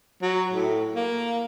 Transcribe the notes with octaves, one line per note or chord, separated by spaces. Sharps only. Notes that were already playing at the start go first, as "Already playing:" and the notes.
F#3
A2
A#3